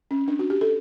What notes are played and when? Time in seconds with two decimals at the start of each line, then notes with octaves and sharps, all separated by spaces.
0.11 C#4
0.28 D4
0.39 F#4
0.50 G4
0.61 A4